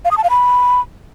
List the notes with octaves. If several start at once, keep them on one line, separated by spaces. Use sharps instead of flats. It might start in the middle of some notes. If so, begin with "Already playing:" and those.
F5
D#6
A5
F5
B5